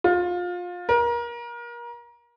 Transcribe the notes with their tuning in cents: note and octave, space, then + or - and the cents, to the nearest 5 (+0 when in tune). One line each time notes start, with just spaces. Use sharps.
F4 +25
A#4 +30